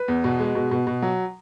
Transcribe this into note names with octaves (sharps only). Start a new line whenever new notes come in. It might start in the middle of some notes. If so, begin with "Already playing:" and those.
Already playing: B4
E2
B2
G#3
B2
B2
B2
F#3